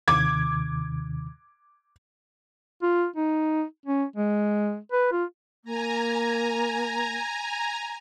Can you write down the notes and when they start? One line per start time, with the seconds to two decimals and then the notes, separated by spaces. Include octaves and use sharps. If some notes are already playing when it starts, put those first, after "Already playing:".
0.08 D#2 C3 D#3 D6 G#6
2.82 F4
3.16 D#4
3.86 C#4
4.16 G#3
4.92 B4
5.12 F4
5.65 A#3 G#5 A#5